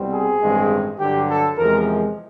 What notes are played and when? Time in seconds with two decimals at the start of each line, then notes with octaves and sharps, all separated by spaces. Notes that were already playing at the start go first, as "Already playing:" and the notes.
Already playing: C2 B2 G3 C4
0.11 G#4
0.40 A1 G2 D#3 G#3 C4
0.98 G2 D3 F#3 G4
1.29 A4
1.58 E2 C3 F3 G#3 A#4